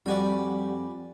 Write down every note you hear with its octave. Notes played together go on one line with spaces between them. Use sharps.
F2 G3 F#4 G4 D5 G#5 B5